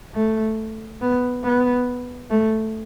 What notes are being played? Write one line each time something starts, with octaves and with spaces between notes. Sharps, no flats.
A3
B3
B3
A3